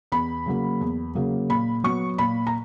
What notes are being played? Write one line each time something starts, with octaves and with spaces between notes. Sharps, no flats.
E2 B5
C#3 F#3 A#3
E2
C#3 F#3 A#3
A#2 B5
F#3 B3 C#6
A#2 B5
A#5